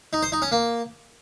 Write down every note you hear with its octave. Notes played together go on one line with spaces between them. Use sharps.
D#4
C5
D#4
C#4
A#3